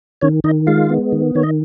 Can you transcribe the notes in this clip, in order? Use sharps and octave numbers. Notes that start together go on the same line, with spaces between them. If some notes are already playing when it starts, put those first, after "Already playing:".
D#3 C#4 C#5
D#3 D#4 D#5
G#3 F4 F5
B3
D#3
D#3 C#5
D#5